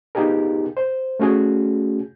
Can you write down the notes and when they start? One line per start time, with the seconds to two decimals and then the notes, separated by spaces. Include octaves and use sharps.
0.15 B3 D#4 F4 G4 G#4 A#4
0.77 C5
1.20 A3 C#4 F#4 G#4